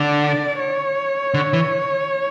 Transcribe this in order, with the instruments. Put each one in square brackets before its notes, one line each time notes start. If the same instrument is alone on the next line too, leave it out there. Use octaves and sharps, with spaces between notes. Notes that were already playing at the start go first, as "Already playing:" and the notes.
Already playing: [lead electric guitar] D3 [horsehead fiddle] D5
[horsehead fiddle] C#5
[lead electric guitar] D3
E3